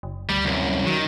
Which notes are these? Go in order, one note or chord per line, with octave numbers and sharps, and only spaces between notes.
F#1
D2 G3
C2 F#2
D#3 F#3